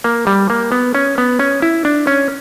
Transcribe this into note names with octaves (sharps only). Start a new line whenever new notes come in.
A#3
G3
A#3
B3
C#4
B3
C#4
E4
D4
C#4